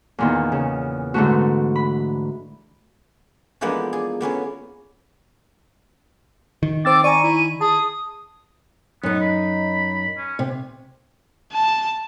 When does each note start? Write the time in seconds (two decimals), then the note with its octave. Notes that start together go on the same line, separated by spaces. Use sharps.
0.18 E2 A#2 D#3
0.52 C#3
1.14 G#2 D3 E3 A3 F#4
1.76 B5
3.61 E3 F3 G#3 A#3 B3 D4
3.93 G#4 D5
4.21 A#3 B3 C#4 G#4
6.63 D#3
6.85 C4 C5 D6 E6 A6
7.04 D5 G#5 A#5 C#6 D#7
7.24 E4
7.61 G#4 A5 D#6
9.03 F#2 B3 D#4
9.21 B5
10.18 C#4
10.39 C3
11.53 A5